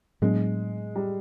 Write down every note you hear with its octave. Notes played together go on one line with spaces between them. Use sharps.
A2 F#3 G#3 B3 D4
G3